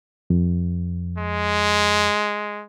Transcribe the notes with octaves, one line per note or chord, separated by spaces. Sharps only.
F2
G#3